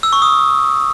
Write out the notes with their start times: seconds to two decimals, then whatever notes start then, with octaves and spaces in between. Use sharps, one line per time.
0.03 E6
0.13 C#6
0.22 D#6